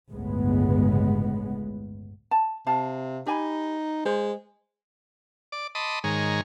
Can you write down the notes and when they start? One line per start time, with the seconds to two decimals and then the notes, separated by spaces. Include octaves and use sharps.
0.11 G1 C#2 A2 G#3 B3
2.31 A5
2.67 C3 F5 A5
3.26 D#4 G4 G#5 B5
4.05 G#3 C5
5.52 D5 D6
5.75 D#5 A5 B5 C6 D6 D#6
6.04 G#2 D#3 G#3 C#5 G#5 A#5